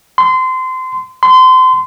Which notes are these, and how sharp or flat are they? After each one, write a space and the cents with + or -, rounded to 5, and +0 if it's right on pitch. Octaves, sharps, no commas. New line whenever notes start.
C6 -25
C6 -30